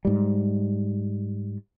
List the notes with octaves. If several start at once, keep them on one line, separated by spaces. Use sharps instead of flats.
G#2 G3